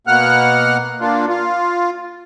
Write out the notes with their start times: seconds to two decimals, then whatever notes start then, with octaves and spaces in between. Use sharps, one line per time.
0.07 B2 A#3 F#5 F6 F#6
1.01 A#3 D4 F4
1.28 F4